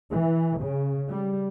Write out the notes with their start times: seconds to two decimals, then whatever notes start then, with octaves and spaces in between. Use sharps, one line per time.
0.11 E3
0.59 C#3
1.08 G3